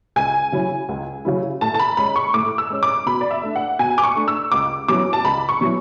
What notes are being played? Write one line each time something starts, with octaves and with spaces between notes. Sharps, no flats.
C#2 G#5
C#3 F#3 C#4 E4
C#2
C#3 F#3 C#4 E4
A2 A5
A5
B5
G#3 C#4 B5
C#6
A2 D6
E6
G#3 C#4
D6
B2 B5
D5
E5
A3 D4
F#5
B2 G#5
D6
C#6
A3 D4
E6
C#2 D6
B2 F#3 C#4 E4 D6
A5
C#2 B5
C#6
B2 F#3 C#4 E4